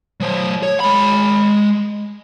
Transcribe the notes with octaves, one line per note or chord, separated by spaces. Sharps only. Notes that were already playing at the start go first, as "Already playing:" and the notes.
F#3 C5
C#5
G#3 B5